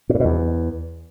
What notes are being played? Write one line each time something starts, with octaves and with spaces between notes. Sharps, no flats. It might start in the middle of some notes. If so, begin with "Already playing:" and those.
A#2
A2
B2
E2